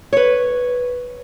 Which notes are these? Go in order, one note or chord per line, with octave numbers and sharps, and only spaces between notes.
B4 C#5